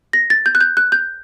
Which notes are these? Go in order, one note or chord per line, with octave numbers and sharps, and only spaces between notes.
A#6
A6
G6
F#6
G6
F#6
G6